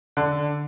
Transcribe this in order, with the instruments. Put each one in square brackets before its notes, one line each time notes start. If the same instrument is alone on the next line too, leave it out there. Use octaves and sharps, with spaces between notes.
[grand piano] D3